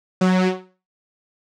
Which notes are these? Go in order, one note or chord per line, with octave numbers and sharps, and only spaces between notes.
F#3